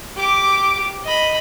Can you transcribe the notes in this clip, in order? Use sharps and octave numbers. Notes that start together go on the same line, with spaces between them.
G4 D6
D#5 B5